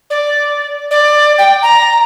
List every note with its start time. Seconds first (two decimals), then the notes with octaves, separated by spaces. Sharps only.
0.10 D5
0.91 D5
1.38 G5
1.62 A#5